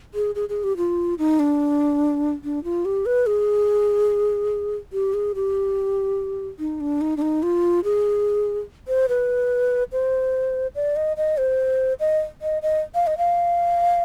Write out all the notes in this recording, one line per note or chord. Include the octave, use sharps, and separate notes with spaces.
G#4
G#4
G#4
G4
F4
D#4
D4
D4
F4
G4
B4
G#4
G4
G#4
G4
D#4
D4
D#4
D4
D#4
F4
G#4
C5
B4
C5
D5
D#5
D#5
C5
D#5
D#5
D#5
F5
D#5
F5